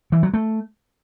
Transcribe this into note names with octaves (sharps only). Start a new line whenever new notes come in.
E3
F#3
A3